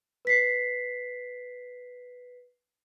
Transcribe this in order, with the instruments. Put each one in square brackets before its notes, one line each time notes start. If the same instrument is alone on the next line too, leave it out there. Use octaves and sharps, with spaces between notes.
[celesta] B4 B6 C7